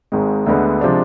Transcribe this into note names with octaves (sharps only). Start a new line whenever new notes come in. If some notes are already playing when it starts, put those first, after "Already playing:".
G#1 G#2 G#3
D2 D3 G#3 B3
C3 F3 G#3 D4